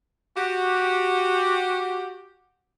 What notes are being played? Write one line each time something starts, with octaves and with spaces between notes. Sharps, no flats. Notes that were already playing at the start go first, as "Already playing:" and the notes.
F#4 G4